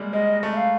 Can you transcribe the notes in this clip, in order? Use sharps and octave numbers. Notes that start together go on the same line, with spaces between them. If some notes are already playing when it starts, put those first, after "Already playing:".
Already playing: G3 G#3 A#3
G#3 D#5
A3
E5
F5